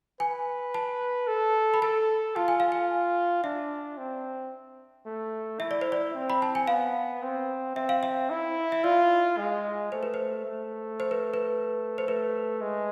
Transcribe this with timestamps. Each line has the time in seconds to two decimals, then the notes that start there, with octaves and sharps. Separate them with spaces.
0.20 B4 G#5
0.74 A5
1.28 A4
1.74 B5
1.82 A4 A5
2.36 F4 A5
2.48 G#5
2.60 F5
2.72 G#5
3.44 D4 E5
3.98 C4
5.06 A3
5.60 E4 E5
5.71 D5
5.81 C5
5.92 D5
6.14 C4
6.30 B5
6.42 A5
6.55 G#5
6.68 B3 F5
7.22 C4
7.76 C4 E5
7.89 F5
8.03 E5
8.30 E4
8.72 E5
8.84 F4 D5
9.38 G#3
9.92 A3 C5
10.03 B4
10.14 C5
10.45 A3
11.00 C5
11.11 B4
11.34 B4
11.98 C5
12.07 A3 B4
12.61 G#3